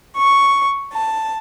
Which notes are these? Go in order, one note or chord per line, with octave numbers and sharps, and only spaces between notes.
C#6
A5